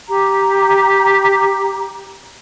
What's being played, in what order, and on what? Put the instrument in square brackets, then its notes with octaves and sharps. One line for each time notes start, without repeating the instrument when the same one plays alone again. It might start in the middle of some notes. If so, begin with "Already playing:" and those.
[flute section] G4 A#5